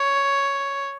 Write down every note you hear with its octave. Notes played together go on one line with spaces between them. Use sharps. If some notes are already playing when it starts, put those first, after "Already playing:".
Already playing: C#5